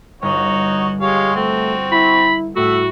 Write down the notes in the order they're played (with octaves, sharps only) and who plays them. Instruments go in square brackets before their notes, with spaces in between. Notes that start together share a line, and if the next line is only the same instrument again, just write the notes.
[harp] G1 [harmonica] D#4 F#4 C#5
[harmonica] G#3 C#5 F5 [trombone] G4
[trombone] A3 [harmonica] C4 F#4
[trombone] E4 [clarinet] B5
[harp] A2 B5 [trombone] A3 [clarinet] F#4 [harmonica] E5 F#5